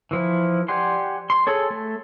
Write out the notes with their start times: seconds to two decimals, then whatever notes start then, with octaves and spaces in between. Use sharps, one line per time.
0.11 E3 F3 E4
0.68 G4 D5 F#5 G#5 C6
1.30 C6
1.47 G#4 A4 C#5
1.70 A3